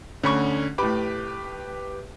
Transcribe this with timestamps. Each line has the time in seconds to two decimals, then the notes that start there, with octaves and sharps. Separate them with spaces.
0.23 D2 D3 C#4 B5 C#6
0.78 A2 G4 B4 B5 D6